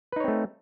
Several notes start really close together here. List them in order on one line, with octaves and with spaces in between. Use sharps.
B4 D#4 C#5 C4 A3